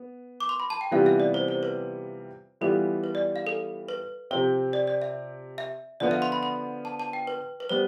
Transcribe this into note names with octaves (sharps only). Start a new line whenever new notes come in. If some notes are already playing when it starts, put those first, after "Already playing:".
Already playing: B3
D6
C6
B5
A5
G5
C3 E3 G3 B3 F4 F5
E5
D5
C5
C5
B4
E3 G3 B3 F4 A4
B4
D5
F5
A4
B4
C3 F3 C4 C5
D5
D5
E5
E5
D3 F3 B3 F4 D5
E5
C6
B5
B5
A5
A5
G5
B4
B4
G3 B3 C5